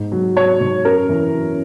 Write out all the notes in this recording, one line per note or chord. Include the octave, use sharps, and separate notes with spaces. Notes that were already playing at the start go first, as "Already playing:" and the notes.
Already playing: G#2
F#3
F#3 C#5
G#2
F#2 A#4
E3
F#2